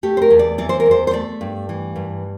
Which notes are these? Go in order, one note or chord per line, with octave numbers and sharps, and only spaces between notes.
A3 G4
C5
A#4
E2
D5
E3 D5
C5
A#4
E2
C5
C5
A3 D5
G2
E3
G2